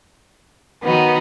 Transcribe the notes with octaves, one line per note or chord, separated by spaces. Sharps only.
D#3 F#3 B3 D#4